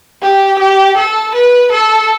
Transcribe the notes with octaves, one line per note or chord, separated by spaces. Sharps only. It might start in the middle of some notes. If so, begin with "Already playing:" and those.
G4
G4
A4
B4
A4